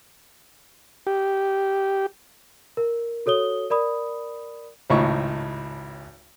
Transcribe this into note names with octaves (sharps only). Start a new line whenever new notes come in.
G4
A#4
F#4 A4 C#5 D#6 G7
A#4 D5 B5 D#6
G#1 C#2 A2 D#4 C#6